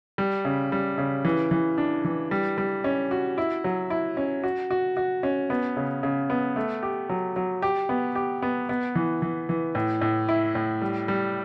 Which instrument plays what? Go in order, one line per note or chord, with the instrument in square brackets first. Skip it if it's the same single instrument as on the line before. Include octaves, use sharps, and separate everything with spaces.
[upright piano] G3
C#3
G3
C#3
E3
E3
D4
E3
G3
G3
C#4
F#4
E4
F#3
E4
C#4
F#4
F#4
F#4
C#4
B3
C#3
C#3
B3
A3
G4
F#3
F#3
G4
B3
G4
B3
B3
E3
E3
E3
A2
A2
E4
A2
G3
G3